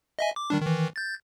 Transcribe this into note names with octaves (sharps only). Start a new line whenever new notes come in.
D#5 E5 G#5
D6
D#3 G3 D4
D#3 E3
G6 A6